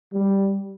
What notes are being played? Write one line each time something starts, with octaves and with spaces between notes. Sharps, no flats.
G3